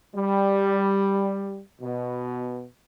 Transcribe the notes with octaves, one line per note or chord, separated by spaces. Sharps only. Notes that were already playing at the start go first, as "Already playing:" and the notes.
G3
B2